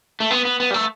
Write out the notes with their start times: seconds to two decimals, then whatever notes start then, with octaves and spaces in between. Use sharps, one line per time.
0.20 A3
0.31 B3
0.45 B3
0.60 B3
0.71 G3
0.74 A3